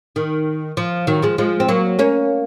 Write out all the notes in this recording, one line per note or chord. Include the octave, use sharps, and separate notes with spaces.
D#3
F3
D#3 F#3
F3 G#3
F3 G#3
C4
F#3 A#3
A#3 C#4